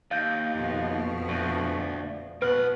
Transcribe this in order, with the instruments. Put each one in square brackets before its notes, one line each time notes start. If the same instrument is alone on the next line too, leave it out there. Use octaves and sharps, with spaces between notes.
[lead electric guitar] D#2 [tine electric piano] F5 G6
[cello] F2 B2
[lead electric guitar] D2
[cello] B2 [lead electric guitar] C4 F#5 [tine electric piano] B4 F6